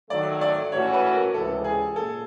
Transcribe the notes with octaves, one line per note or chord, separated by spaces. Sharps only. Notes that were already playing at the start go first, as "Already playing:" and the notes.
D#3 F#3 A3 D5
D5
A2 E3 A3 C#4 F#4 C#5
B4
A#4
C#2 C3 E3 A4
G#4
A#2 A4